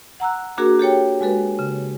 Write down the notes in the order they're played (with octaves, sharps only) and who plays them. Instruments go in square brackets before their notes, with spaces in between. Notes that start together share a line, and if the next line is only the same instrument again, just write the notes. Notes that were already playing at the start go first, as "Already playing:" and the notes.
[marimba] F#5 A#5 E6 F#6
A#3 D4 F#4 G#4 A#4
G4 A4 C#5 G5
G#3 F#4 A4 B4
C#3